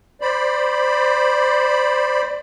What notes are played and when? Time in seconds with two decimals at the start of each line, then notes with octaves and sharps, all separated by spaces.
0.21 C5 D5 B5